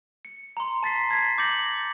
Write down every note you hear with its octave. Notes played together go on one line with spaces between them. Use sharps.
C#7
A#5 C6
A5 A6 B6 C7
G#6 B6
D6 G6 A6 A#6 C#7 F#7